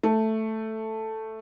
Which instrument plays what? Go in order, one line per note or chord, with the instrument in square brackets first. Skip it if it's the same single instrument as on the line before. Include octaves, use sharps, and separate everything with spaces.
[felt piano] A3